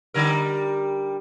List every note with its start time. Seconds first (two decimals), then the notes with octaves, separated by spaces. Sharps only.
0.14 D3 G3 A#4